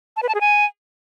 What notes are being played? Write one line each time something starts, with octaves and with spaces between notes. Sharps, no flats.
A5
B4
A5
G#4
G#5